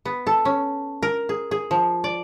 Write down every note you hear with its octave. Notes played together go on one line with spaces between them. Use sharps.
B3
A4
C#4
A#4
G#4
G#4
F3
D5